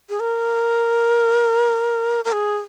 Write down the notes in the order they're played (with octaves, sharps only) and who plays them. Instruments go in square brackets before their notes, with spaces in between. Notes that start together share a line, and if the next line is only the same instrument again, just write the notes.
[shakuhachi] G#4
A#4
A#4
G#4